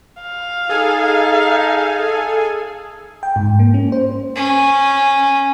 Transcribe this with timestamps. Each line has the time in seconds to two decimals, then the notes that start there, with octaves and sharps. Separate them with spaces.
0.23 F5
0.69 D#4 G#4 A4 G#5
3.23 G5
3.36 G#2
3.59 A#3
3.74 C#4
3.92 C5
4.36 C#4